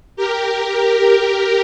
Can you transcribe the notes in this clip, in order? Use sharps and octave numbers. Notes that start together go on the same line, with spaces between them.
G4 A#4